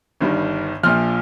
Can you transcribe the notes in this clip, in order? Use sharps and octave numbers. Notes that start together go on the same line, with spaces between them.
G1 G2 D#3 G3
A#1 A#2 F3 F6